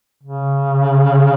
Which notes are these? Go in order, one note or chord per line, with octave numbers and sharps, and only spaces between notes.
C#3